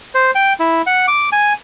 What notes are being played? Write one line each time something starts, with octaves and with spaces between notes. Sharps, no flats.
C5
G5
E4
F#5
D6
G#5